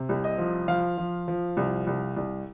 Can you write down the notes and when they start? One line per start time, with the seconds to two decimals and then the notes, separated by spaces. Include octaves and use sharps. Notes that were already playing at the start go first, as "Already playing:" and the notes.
Already playing: C3
0.09 C2
0.24 D#5
0.38 F3
0.68 F3 F5
0.98 F3
1.28 F3
1.57 C2
1.87 C2
2.16 C2